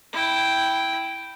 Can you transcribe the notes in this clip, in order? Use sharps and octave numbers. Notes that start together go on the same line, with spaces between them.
E4 G5